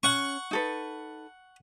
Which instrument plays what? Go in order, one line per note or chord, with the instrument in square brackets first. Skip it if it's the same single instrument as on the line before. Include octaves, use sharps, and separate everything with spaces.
[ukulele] C#4 [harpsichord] F#5 C#6
[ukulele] D#4 A4 B4